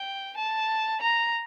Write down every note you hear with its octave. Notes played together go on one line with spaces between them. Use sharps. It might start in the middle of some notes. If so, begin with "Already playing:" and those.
Already playing: G5
A5
A#5